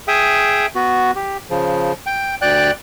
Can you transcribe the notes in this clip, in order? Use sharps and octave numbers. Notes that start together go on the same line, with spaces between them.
G#4 E5 G5 D#6
B3 F#4
G4
C#3 F3
G5
D2 D5 G5 F#6